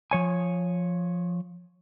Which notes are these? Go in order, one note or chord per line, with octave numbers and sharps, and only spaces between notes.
F3 C#5 G#5